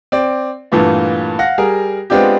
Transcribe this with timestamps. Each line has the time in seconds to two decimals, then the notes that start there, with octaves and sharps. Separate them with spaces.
0.12 C4 D5
0.72 G2 A#2 E3 A3 B3 F4
1.39 F5 F#5 A#6
1.58 G3 G#4 A#4
2.10 G#3 B3 C4 D4 F4 G4